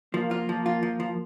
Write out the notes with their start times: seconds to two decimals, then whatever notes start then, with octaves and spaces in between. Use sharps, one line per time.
0.14 F3 A#3
0.31 F4
0.49 F3
0.66 F4
0.83 F3
1.00 F3